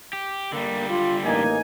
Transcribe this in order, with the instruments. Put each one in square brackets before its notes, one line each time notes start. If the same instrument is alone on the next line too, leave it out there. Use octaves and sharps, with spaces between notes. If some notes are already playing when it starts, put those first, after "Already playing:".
[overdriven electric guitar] G4
[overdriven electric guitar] D3 G3 [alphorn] A#3
[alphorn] F4
[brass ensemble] A1 D#4 G#5 [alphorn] A#3